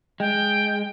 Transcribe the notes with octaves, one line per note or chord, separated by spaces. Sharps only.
G#3 G5